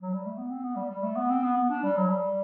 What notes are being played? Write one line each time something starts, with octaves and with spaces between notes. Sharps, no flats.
F#3
G3
A3
B3
C4
B3
G3
G3
A3
B3
C4
B3
B3
D4
G3
F#3
G3